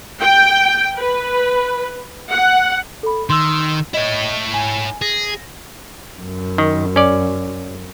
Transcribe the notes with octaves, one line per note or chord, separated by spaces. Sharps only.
G5
B4
F#5
A4 B5
D#3 C6 E6
E4 C#5 D#5
G#5
G#4 A#6
F#2
D#3
C#4 D5